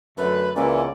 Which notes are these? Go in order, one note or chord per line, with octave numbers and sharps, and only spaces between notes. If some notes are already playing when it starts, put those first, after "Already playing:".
F#2 D3 A3 B4
C#2 A#2 E3 C#4 D5